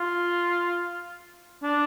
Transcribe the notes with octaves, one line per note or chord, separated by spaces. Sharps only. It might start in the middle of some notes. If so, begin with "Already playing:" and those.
Already playing: F4
D4